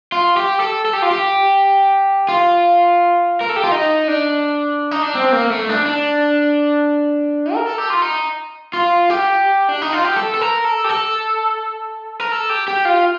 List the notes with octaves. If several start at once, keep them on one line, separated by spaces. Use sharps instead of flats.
F4
G4
A4
A4
G4
F4
G4
F4
A#4
A4
G4
F4
D#4
D4
D#4
D4
C4
A#3
A3
D4
D4
A#4
A4
G4
F4
D#4
F4
G4
D4
D#4
F4
G4
A4
A4
A#4
A4
G4
A4
A#4
A4
G4
G4
F4